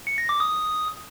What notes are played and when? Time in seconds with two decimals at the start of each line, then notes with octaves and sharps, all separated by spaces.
0.07 C#7
0.18 A#6
0.29 D6
0.40 D#6